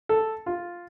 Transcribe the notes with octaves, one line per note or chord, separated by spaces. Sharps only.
A4
F4